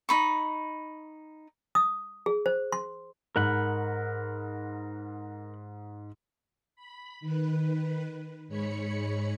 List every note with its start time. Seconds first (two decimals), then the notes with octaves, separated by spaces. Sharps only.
0.09 D#4 B5 C#6
1.75 D#6
2.26 G#4
2.46 C5
2.72 C6
3.36 G#2 A#4 F#5 B5
6.75 B5
7.20 D#3 B4
8.48 G#2 G#3 C#5 B5 C#7